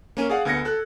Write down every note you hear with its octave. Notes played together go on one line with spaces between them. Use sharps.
A#3 C#4 D#7
G#4 D5 F5 F#5
D2 B3 G#6 A#6 C#7
A4 F#6